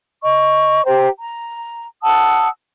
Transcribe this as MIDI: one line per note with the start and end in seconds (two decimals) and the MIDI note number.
0.22 0.84 75
0.22 0.84 85
0.86 1.07 67
0.86 1.07 72
0.86 1.07 79
0.86 1.07 82
1.18 1.84 82
2.02 2.48 78
2.02 2.48 81
2.02 2.48 87
2.02 2.48 88